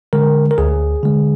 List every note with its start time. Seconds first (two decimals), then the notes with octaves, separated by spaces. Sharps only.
0.13 D3 G#3 A#4
0.51 A#4
0.58 D2 G#4
1.03 D3 G#3